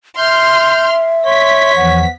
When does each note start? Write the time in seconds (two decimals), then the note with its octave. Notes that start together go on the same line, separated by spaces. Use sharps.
0.17 E5 C6 F6 G6
1.26 C#5 C6 B6
1.76 E2 E3 F3 F#5